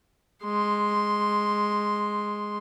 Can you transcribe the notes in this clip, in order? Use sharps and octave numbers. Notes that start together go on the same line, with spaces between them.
G#3 C6